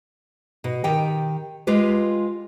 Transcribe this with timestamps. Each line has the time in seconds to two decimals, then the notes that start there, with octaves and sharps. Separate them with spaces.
0.64 B2
0.84 D#3 G4 G5
1.67 G#3 F4 G4 B4